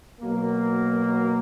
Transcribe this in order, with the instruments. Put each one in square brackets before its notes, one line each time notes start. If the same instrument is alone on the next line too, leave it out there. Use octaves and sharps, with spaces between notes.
[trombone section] B2 F#3 A#3